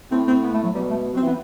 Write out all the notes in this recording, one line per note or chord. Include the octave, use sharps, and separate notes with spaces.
A2 C4
C4
B3
A3
F#3
B2 G3
A3
F#3 C4
E3
B3